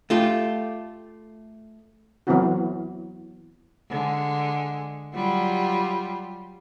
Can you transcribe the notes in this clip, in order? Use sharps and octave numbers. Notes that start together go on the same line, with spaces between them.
A3 F4 G4
E3 F#3 B3 C4 E4 F#4
D3 G#3
F#3 G3 F4